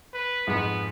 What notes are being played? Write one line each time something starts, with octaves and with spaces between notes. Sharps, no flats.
B4
F2 G#2 B3